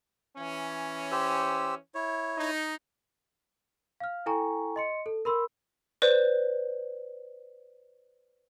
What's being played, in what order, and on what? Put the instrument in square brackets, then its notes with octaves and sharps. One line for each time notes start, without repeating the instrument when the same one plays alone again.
[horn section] E3 C#4
[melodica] G4 C5 E6
E4 C#5
[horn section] D#4
[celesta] F5 F6
E4 A4 G5 G#5 A#5 C#6
D#5 C6 C#7
A4
A#4 B5 C6 E6
[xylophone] B4 C5 D5